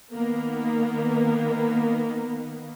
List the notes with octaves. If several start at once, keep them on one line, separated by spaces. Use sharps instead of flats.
D#3 A#3 B3